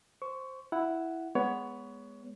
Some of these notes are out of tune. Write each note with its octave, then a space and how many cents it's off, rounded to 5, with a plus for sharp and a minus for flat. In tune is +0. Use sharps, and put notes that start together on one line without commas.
C5 +0 C#6 +20
E4 +0 F#5 +0
G#3 +0 B3 +0 C#5 +20